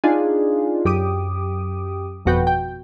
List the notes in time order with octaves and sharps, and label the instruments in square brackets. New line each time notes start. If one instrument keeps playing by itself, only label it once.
[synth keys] D4 D#4 F4 G#4
F#2 G4 D6 D#6
G1 F2 B2 F#4 B4 G5
G5